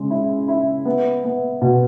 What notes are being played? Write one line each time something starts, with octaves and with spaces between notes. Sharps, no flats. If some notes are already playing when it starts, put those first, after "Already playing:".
Already playing: C#3 G#3
E4
E4
B3
B3
B2